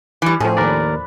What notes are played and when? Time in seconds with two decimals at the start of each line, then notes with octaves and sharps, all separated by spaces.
0.22 E3 G3
0.40 A2 F3 A3 C4 C#4 G#4
0.57 D#2 D4 A#4 B4 D5